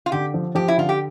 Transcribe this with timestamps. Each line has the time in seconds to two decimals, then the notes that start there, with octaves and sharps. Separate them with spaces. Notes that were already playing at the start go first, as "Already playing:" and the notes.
0.06 F4
0.12 D3 G4
0.34 F3
0.55 F3 G4
0.68 E4
0.78 D3 F4
0.89 G4